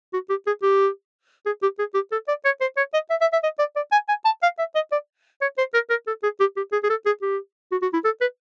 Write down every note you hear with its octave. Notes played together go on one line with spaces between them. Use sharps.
F#4
G4
G#4
G4
G#4
G4
G#4
G4
A4
D5
C#5
C5
C#5
D#5
E5
E5
E5
D#5
D5
D5
G#5
G#5
A5
F5
E5
D#5
D5
C#5
C5
A#4
A#4
A4
G#4
G4
G4
G#4
G#4
A4
G#4
G4
F#4
F#4
E4
A4
B4